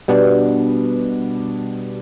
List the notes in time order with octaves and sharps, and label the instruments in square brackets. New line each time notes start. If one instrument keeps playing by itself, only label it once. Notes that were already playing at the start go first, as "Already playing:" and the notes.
[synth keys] B2 G3 B3 D4